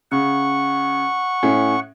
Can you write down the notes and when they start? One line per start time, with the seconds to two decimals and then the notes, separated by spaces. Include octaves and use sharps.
0.12 C#3 F#5 C#6
1.43 A2 C#4